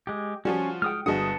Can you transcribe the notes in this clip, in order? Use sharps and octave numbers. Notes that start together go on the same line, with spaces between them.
G#3 G4
F3 G3 C#4 F4 F#4 D5
G#3 F#5 G5 D#6 F6
G1 D4 F#4 G#4 D#5 F#5 A5 D#6